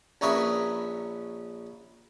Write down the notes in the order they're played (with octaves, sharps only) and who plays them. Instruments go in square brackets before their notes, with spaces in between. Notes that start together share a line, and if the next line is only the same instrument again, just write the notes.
[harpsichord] A#1 C#4 A#4 B4 E5 D#6